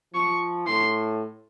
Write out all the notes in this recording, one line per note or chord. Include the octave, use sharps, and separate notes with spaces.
F3 C#6
A2 C6